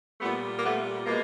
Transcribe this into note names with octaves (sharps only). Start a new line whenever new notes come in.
A#2 G3 A3 B3
A#3
A3 B3
B2 G#3 A#3